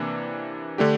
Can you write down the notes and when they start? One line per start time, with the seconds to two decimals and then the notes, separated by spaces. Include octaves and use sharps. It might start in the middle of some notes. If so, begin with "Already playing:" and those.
Already playing: C3 E3 A#3 D4
0.78 D3 A3 D4 G4